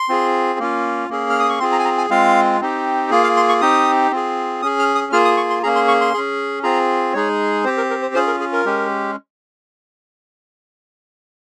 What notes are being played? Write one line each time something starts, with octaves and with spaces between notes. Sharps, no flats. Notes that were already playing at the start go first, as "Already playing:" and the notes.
Already playing: C6
C4 F4 G#4
A#3 C#4 F4
A#3 C#4 G#4
F6
D#6
C#6
C4 F4 G#4 C6
A#5
G#5
A#5
G#5
G#3 C4 F4 F5
C4 D#4 G4
A#3 F4 G#4
F5
C6
C#6
C4 D#4 G4 D#6
C4 F4 G#4
C#4 G#4 D#6
F6
D#6
A#3 F4 G#4 F6
D#6
C#6
C6
A#3 C#4 G#4 A#5
C6
C#6
C6
C#4 G#4
C4 F4 G#4 A#5
G#3 D#4 G#4 C#5
C4 G4 C5
A#4
A#4
C5
C#4 F4 G#4 C5
A#4
G#4
A#4
G#3 C#4 G4